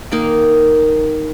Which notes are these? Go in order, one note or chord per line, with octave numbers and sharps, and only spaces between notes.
D#3 A#3 D#4